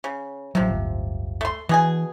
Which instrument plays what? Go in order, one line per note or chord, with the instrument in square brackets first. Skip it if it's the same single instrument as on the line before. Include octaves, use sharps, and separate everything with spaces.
[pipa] C#3
[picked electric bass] A1 F#3 [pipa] C3 F3
[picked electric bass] D1 G1
[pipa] A3 C6
[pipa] B2 G#4 G#5 [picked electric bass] E3